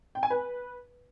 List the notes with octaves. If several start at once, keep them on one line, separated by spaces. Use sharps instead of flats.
G5
G#5
B4